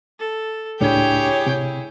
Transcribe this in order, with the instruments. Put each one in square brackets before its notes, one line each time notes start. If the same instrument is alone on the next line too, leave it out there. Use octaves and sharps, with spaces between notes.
[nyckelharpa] A4
[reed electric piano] C#2 A2 D4 [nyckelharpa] E4 G#4 [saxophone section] G4 C#5 [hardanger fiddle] G5
[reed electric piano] C3